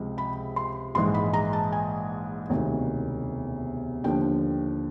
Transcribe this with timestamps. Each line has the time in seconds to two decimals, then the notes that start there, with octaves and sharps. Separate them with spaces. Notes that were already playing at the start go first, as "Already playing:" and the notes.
Already playing: C#2 C3 F3 G#3
0.18 B5
0.56 C6
0.95 A#1 G#2 E3 G#3 C6
1.14 B5
1.33 A#5
1.53 A5
1.72 G#5
2.49 E1 D2 C3 D#3
4.04 D#2 D3 F3 G5